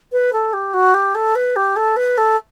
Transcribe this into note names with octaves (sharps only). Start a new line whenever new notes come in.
B4
A4
G4
F#4
G4
A4
B4
G4
A4
B4
A4